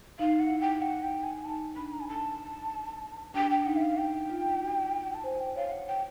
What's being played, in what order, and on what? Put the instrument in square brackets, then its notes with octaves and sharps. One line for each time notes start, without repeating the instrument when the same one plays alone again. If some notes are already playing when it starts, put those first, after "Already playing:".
[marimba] D#4 [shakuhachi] F5
[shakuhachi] F#5
[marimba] E4
[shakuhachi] G5
F#5
G5
G#5
[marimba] D#4 [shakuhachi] A5
[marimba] D4 [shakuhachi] B5
[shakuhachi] A#5
G#5
A5
[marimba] D4 [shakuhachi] G5
[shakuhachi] G5
[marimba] D#4 [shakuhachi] F#5
[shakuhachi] E5
F5
[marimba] E4 [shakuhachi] G5
[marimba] F4
F#4
[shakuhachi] A5
[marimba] C5 [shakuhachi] G#5
[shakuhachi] G5
[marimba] C#5 [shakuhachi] F5
[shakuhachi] F#5
G5